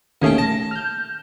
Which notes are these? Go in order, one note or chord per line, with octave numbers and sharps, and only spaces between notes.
D#2 D#3 A3 C#4 G#4 G5
A5 A#6
F6 G6